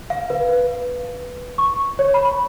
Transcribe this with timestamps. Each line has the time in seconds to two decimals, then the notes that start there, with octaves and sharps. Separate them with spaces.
0.10 F5
0.30 B4
1.58 C#6
1.99 C#5
2.14 B5